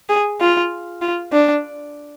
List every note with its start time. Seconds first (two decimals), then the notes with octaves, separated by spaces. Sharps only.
0.09 G#4
0.41 F4
1.01 F4
1.32 D4